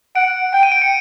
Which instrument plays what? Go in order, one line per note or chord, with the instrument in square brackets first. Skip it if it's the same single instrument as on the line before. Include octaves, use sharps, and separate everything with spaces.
[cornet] F#5 [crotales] D7
[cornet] G5 [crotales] D7
[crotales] D#7
D7
C#7